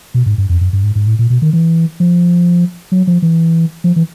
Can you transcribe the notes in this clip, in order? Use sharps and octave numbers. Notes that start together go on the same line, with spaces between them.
B2
G#2
G2
F2
F#2
G2
G#2
G#2
A2
A#2
B2
D#3
E3
F3
F#3
F3
E3
F3
E3